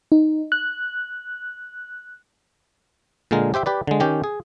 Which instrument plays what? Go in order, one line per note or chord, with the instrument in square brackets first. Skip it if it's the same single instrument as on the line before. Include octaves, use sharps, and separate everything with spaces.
[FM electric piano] D#4
F#6
[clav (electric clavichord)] A#2 D3 G#3 A#4
G4 C5 E5 G5
G4 B4 D5
D3 G#3
D#3 C#4 G4 G5
G#4